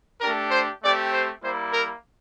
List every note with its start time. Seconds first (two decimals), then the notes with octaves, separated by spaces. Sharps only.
0.21 A3 D4 G4 A#4
0.51 C5
0.83 A3 C4 G4 D5
1.13 C5
1.43 G3 A#3 E4 C5
1.73 A#4